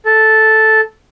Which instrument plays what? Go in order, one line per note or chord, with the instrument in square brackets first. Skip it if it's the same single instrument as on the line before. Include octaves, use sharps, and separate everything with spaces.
[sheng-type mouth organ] A4